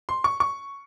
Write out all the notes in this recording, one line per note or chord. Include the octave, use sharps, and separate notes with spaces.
C6
C#6
C#6